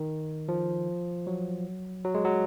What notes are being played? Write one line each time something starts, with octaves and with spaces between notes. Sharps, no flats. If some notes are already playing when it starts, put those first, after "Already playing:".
Already playing: D#3
F3
F#3
F#3
G#3
F#3